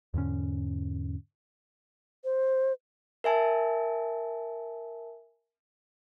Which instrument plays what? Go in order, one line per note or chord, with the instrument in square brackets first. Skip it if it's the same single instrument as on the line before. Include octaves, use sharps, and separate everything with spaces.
[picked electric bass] E2 G#2 D3 C#4
[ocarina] C5
[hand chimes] A#4 E5 G#5 A5